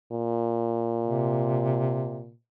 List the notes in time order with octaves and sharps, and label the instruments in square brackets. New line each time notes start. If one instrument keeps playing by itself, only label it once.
[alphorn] A#2
[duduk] C3